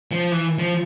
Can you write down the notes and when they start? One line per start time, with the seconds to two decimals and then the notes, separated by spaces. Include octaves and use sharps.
0.11 F3
0.32 E3
0.58 F3